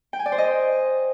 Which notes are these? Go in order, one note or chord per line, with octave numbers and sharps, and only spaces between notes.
G5
G#5
D5
C5
D#5